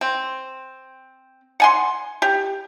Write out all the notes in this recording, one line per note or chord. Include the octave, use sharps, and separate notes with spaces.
C4
F#5 G#5 C6
G4